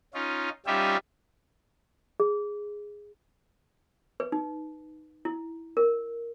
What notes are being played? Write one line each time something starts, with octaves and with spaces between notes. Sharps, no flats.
C#4 D#4 F4
G3 C#4 D#4 F4 G4 E5
G#4
B4
D#4
E4
A#4